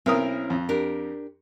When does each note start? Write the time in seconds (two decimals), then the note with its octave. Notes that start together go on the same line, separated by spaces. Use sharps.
0.06 B1 C4 C#4 E4 A#4 D#6
0.50 F2
0.69 D4 G4 A#4